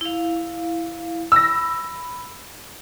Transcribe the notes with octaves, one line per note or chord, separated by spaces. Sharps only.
E4 F5
B5 E6 A#6